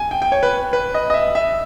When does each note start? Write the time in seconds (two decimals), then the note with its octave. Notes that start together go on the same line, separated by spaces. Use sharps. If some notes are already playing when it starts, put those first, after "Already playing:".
Already playing: G#5
0.11 G5
0.22 G5
0.32 C#5
0.43 B4
0.73 B4
0.94 D#5
1.10 D#5
1.14 E5
1.35 E5